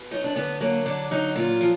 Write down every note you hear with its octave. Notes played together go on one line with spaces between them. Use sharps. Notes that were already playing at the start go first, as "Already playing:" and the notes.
Already playing: B2
F#3 D#4
D4
D3 B3
F#3 A#3
D3 D4
F#3 D#4
A#2 F4
F3